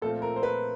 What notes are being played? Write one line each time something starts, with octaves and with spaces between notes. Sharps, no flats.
A#2 F3 A3 C4 F4 A4
A#4
C5
B4